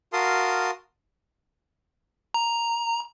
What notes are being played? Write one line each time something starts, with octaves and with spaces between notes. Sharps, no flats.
F#4 A#4 F5 A5 C6 D#6
A#5